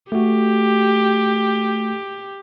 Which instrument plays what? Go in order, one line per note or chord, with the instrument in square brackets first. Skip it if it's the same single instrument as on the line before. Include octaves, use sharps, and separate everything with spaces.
[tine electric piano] A3 F#4 [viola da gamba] G4